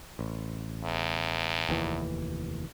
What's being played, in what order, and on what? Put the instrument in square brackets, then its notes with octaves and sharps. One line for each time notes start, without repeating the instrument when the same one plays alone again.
[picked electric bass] A1
[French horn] E2
[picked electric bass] F1 D#2 E3